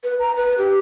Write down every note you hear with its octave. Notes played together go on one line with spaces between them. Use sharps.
B4
A#5
B4
G4